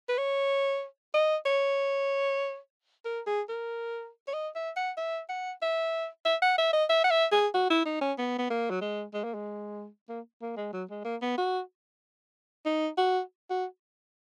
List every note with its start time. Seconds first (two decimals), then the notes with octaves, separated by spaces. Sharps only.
0.09 B4
0.18 C#5
1.14 D#5
1.46 C#5
3.05 A#4
3.27 G#4
3.49 A#4
4.27 C#5
4.33 D#5
4.55 E5
4.76 F#5
4.97 E5
5.29 F#5
5.62 E5
6.25 E5
6.42 F#5
6.58 E5
6.73 D#5
6.89 E5
7.04 F#5
7.11 E5
7.32 G#4
7.54 F#4
7.70 E4
7.85 D#4
8.01 C#4
8.18 B3
8.39 B3
8.50 A#3
8.70 F#3
8.81 G#3
9.14 G#3
9.24 A#3
9.34 G#3
10.09 A#3
10.42 A#3
10.57 G#3
10.73 F#3
10.90 G#3
11.05 A#3
11.22 B3
11.38 F#4
12.66 D#4
12.98 F#4
13.50 F#4